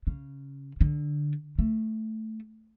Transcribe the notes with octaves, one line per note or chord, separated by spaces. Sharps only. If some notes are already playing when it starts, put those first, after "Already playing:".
C#3
D3
A3